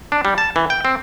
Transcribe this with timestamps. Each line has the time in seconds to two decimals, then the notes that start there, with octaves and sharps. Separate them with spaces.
0.12 D4
0.25 G3
0.38 A5
0.56 E3
0.70 G5
0.85 C4